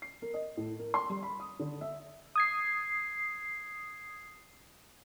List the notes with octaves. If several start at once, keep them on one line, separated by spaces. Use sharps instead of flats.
C7
A#4
D#5
A2
A#4
C6
G3
B5
D#6
D3
E5
D#6 G#6 C7